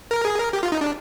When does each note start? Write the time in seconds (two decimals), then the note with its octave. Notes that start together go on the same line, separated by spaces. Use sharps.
0.11 A#4
0.25 G#4
0.39 A#4
0.53 G4
0.63 F4
0.72 D#4
0.81 D4